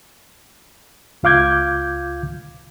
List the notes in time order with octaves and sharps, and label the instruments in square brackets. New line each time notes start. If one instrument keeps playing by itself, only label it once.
[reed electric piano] C#2 F4 F5 D6 G6 G#6